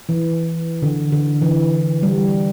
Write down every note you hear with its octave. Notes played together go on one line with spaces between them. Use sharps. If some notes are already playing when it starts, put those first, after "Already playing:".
E3
D3
D3
E3
G3